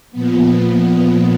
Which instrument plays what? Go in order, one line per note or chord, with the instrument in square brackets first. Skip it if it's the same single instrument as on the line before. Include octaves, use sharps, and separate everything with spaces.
[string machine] A#2 F3 B3